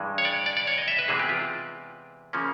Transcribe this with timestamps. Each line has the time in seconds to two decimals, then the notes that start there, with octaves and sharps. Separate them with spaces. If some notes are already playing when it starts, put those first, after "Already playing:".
Already playing: G2 E3 G#3
0.18 C#5
0.25 D5
0.46 D5
0.57 D5
0.67 C#5
0.78 D#5
0.88 E5
0.99 B4
1.08 E2 C3 E3 G#3 C4 G#4
1.19 G4
1.29 F4
2.33 C#3 F3 A#3 C#4